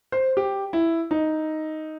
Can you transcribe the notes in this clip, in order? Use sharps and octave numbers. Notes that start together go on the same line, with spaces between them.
C5
G4
E4
D#4